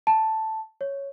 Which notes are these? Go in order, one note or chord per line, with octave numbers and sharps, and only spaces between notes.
A5
C#5